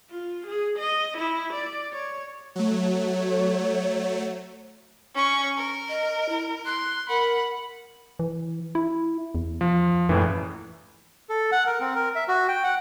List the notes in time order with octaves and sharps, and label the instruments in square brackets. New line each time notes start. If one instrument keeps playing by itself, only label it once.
[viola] F4
G#4
D#5
E4
D5
C#5
[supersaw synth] F#3 A3 [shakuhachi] C#5
[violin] C#4 C#6
A#4
[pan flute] D#5
E4
[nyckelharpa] C6 [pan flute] F#6
[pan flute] A#4 [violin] F#5 [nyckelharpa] B5
[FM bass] E3
E4
E2
[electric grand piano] F3
[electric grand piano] A#1 A2 E3 [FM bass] F#2
[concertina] A4
F#5
A#4
C4
A#4
E5
F#4
G5
F#5